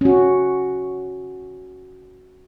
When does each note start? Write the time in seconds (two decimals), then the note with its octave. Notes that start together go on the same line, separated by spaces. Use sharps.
0.01 C#4 F#4